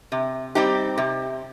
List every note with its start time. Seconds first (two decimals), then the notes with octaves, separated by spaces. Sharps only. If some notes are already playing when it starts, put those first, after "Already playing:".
0.12 C3
0.55 G3 C4 D#4 G4
0.98 C3